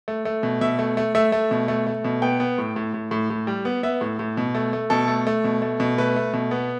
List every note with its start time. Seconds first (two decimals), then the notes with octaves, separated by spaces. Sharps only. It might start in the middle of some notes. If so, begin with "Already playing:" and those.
0.08 A3
0.25 A3
0.43 B2
0.61 B2 E5
0.79 A3
0.97 A3
1.15 A3 E5
1.32 A3
1.51 B2
1.68 A3
1.87 A3
2.04 B2
2.22 B3 G5
2.40 B3
2.58 A2
2.76 A2
2.94 A2
3.11 A2
3.30 A2
3.47 G3
3.65 B3
3.83 B3 E5
4.01 A2
4.19 A2
4.37 B2
4.55 A3
4.73 A3
4.90 B2 A4
5.08 A3
5.27 A3
5.44 B2
5.62 A3
5.80 B2
5.98 A3 B4
6.16 A3
6.34 B2
6.51 B3